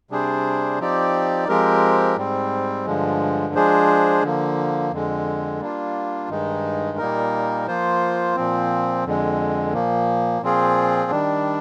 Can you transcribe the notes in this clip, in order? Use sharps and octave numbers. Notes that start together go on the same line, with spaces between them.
C3 G3 D4 G#4 C5
F3 C4 D#4 G4 D5
F3 G#3 C4 G4 A#4
G#2 G3 C4
G2 D3 F3 G#3
F3 G#3 D4 G#4 C5
D3 F3 A#3
F2 D3 G#3
G3 A#3 D4 F4
G2 D#3 G#3 D#4
A#2 G3 A#3 D#4 A#4
F3 A#3 F4 C5
A#2 F3 C4
F2 D3 G#3
A#2 F3 A#3
A#2 F3 C4 F4 G#4
D#3 G3 D4